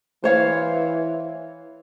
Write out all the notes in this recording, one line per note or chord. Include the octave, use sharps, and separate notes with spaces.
E3 C5 C#5 F5